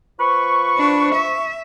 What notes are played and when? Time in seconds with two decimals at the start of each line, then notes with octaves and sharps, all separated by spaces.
0.19 F3 B4 C#6
0.77 D4
1.15 E5